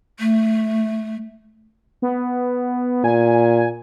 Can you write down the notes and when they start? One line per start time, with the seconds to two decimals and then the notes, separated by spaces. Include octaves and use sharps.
0.20 A3
2.02 B3
3.04 A#2 G#5